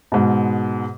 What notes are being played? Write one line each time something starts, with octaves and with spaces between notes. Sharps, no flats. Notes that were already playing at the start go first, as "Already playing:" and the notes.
G#2 B2